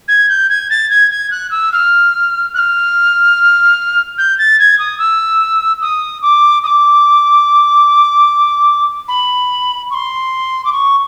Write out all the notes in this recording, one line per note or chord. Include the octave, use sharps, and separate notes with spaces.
G#6
G6
G#6
A6
G#6
G#6
F#6
E6
F6
F#6
F6
G6
A6
G#6
D#6
E6
D#6
D6
D#6
D6
B5
C#6
C6
D6
C#6